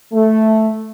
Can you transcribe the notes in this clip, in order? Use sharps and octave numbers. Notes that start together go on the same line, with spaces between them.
A3